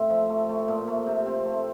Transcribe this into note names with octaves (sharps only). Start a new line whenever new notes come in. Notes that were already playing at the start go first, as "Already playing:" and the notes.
Already playing: A2 C4 E5
F3
A3
A3
A#2
A3
C3
C4
A3